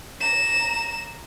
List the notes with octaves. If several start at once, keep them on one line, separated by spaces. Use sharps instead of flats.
A#5 E7